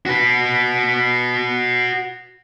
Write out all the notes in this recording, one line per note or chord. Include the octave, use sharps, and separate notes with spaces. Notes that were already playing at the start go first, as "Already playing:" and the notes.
F#4 B4